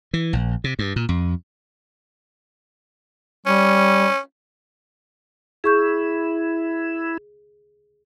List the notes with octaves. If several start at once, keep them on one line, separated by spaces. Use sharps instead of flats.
E3
A#1
C3
G2
A#2
F2
G3 C#4
E4 G#4 C#6 G6